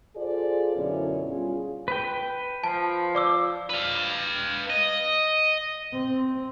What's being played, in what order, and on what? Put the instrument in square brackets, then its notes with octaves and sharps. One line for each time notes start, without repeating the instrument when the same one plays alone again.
[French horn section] F4 G#4 A4 C5 D5
F#2 B2 D3 B3 C#4 E4
G3 C#4 F4 G#4
[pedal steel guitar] B4 G5
[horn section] F3 [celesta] A5
[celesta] D5 D6 E6
[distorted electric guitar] B4 F5
D#5
[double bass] C4